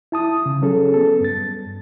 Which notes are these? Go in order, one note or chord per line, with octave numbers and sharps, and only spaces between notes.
E4 A5 D#6
C#3
F#3 C#4 G#4 A4
B3 A4
G2 A6